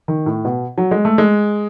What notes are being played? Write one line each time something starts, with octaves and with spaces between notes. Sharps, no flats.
D#3
A2
B2
F#3
G#3
A3
G#3